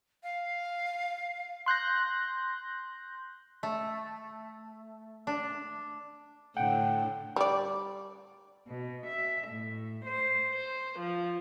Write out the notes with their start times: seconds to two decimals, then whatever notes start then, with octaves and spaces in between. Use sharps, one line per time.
0.23 F5
1.66 C6 F#6 G6 A#6
3.63 A3
5.27 D4
6.57 A2 D3 F#5 G5
7.36 G3 D5
8.68 B2
9.06 E5
9.48 A2
10.07 C5
10.53 C5
11.00 F3